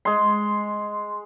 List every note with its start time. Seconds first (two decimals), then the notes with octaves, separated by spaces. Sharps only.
0.05 G#3 C6